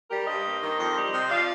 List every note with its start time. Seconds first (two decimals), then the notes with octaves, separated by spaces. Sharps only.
0.10 G3 G4 A#4
0.27 G2 C5 D#5
0.45 A#3
0.62 D#3
0.78 F2
0.96 G3
1.13 C3
1.30 F3 D5 F5